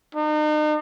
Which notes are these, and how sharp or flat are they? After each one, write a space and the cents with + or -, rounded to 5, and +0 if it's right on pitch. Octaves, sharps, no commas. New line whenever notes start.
D#4 -40